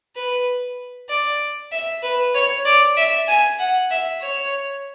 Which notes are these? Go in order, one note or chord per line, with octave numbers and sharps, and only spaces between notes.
B4
D5
E5
B4
C#5
D5
E5
G#5
F#5
E5
C#5